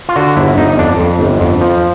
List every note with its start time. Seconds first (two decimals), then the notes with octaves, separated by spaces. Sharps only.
0.09 F4
0.16 D3 F#4
0.37 G1 E4
0.57 G1 D#4
0.78 F2 D4
1.00 F2
1.19 G1
1.40 F2
1.61 F3